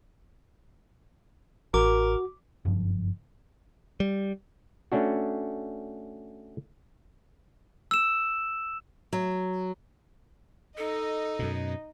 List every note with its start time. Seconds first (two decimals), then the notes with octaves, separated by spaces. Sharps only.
1.74 A1 F#4 A#4 D6
2.65 F#1 G2 F3
4.00 G3
4.92 A3 C#4 D4 F#4
7.91 E6 E7
9.13 F#3
10.78 D#4 A4 D#5
11.39 F#2 B2